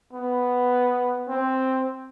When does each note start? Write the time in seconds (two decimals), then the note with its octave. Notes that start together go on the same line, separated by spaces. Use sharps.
0.13 B3
1.28 C4